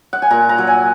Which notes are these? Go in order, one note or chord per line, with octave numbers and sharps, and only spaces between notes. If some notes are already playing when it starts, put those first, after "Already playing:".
F#5
G#5
A#2 A#5
A#5
F#3
G#5